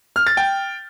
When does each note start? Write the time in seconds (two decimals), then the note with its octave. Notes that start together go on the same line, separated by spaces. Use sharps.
0.16 F6
0.27 A6
0.37 G5